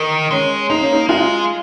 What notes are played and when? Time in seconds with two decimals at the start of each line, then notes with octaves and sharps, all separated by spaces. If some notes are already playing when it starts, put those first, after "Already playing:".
Already playing: D#3 A#4
0.30 G#3 C#4
0.70 A#3 D#4
0.81 C#4
0.93 D#4
1.09 G#3 F4